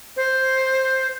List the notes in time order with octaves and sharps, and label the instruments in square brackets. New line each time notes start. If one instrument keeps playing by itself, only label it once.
[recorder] C5